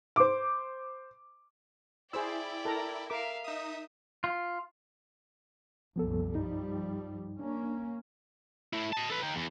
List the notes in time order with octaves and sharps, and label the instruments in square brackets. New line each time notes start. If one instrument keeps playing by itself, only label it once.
[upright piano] C5 D6
[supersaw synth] E4 [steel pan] G#4 C5 E6 [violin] D5 G5
[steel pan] A4 A#4 A#5
[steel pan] A#4 D6 [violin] E5 F5
[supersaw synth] D#4 D#6 [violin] E5
[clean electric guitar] F4
[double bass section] C2 F#2 A#2 [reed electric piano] F3 B3 A4
[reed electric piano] G2 D#4 [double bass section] F3 G3
[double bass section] A#3 C#4 [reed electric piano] D4
[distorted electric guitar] A3 E4
D#5 A5
A4 B4
D#4 G4
E2